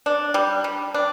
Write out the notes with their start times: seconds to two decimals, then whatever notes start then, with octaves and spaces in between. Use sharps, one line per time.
0.06 D4
0.34 G3
0.64 G3
0.94 D4